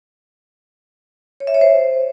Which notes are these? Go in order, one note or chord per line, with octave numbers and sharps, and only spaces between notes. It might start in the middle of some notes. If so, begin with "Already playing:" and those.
C#5
E5
C#5
C5